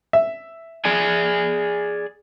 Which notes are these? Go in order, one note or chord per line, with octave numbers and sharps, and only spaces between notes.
E5
G#4 D5 G#5